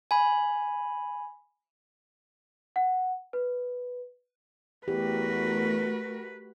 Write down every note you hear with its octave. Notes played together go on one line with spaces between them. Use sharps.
G#5 B5
F#5
B4
E2 A3 F#4 G4 A#4 B4